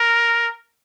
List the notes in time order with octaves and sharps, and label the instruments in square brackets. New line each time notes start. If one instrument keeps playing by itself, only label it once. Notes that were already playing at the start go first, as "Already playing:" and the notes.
Already playing: [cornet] A#4